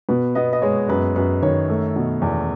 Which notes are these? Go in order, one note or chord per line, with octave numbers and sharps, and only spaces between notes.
B2 B4
B3 D#5
D#5
G#3 C#5
F#2 B4
F#2 B4
D#3 C#5
A3
B2
E2